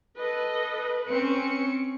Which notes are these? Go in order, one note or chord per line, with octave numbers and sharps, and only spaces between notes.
A4 B4 D#5
C4 C#4 C#7